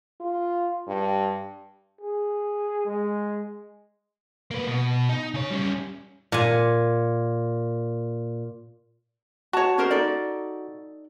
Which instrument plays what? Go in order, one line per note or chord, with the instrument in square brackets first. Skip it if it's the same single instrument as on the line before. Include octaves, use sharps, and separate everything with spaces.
[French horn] F4
G2
[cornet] G#4
G#3
[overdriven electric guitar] A#3 B4
B2
D#4
C#3 C#5
G3 C#4
[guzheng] A#2 G#5
[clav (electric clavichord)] F#4 [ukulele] C#5 A5
[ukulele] C#4 A#4 C5
D#4 A4 D5